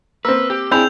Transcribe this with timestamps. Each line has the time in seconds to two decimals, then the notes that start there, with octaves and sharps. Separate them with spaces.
0.25 A#3 C4 B4 E6
0.50 G4
0.71 C4 D4 E4 G#4 B5 E6 G6 F7